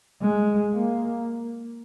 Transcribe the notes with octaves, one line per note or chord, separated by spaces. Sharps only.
G#3
A#3